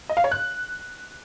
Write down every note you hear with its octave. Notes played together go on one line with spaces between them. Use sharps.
D#5
F5
C#5
F#6